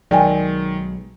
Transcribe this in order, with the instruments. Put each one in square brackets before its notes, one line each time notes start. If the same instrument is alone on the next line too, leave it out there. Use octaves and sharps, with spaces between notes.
[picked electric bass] B1 F#3 G#3 [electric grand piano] D#3 [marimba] D5 G5 G#5